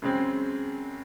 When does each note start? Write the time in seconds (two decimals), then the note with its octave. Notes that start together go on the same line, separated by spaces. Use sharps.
0.02 F#2 C#3 G#3 C4